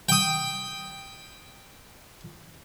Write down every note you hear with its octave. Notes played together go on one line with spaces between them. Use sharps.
G5 D#6